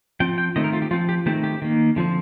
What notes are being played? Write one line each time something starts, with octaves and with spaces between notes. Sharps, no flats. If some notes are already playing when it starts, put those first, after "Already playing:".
F3 C4 G5
G5
D#3 A3 C4 D#5
A#4
F4
G4
F3 C4 F4
G4
D#3 A3 C4 G4
G4
D#3 A#3
D3 F3 C4